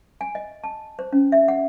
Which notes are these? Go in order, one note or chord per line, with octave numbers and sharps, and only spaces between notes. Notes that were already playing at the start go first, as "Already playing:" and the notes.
G#5
D#5
A5
C5
C#4
E5
F#5